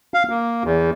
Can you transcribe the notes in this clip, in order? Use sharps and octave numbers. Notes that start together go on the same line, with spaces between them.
F5
A#3
E2